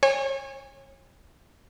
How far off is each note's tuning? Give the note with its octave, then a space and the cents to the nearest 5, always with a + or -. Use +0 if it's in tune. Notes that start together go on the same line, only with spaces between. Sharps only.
C#5 -35 G#5 -35